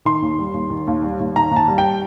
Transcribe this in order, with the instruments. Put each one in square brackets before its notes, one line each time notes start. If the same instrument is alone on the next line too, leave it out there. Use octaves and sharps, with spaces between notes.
[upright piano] D#3 C6
D#2
G3
D#2
D#3
D#2
G3
D#2
D#3 A#5
D#2
A5
G3
G5